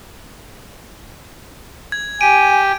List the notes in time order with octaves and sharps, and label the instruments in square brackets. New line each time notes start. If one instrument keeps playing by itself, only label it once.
[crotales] G#6
[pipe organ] G4 [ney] G#5 [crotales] D7 D#7